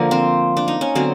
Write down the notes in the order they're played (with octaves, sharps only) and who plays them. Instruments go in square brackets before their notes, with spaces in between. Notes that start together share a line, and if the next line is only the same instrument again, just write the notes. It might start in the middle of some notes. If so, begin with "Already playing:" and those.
Already playing: [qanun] D3 F3 A#3
C4
D4
D#4
C#4
D3 F#3 B3 C4